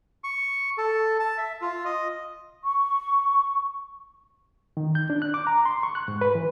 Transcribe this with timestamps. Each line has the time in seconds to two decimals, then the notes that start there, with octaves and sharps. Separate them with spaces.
0.24 C#6
0.78 A4
1.20 A5
1.38 E5
1.61 F4
1.85 D#5
2.64 C#6
4.77 D#3
4.95 G6
5.10 D4
5.22 F#6
5.34 D6
5.47 A#5
5.65 C6
5.83 C#6
5.95 F#6
6.08 G#2
6.21 B4
6.35 E3